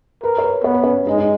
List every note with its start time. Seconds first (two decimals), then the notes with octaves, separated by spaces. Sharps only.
0.23 A#4 B4
0.38 C#5
0.44 B4
0.64 B3 C#5
0.74 B4
0.83 C#4 C#5
1.06 G#3 D#4 D#5
1.18 D#4 D#5